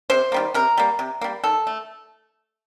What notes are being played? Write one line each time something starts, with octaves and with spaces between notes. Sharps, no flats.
C3 C5
D#3 G3 A#3
C3 A#4
G3 A#3
C3
G3 A#3
D#3 A4
A3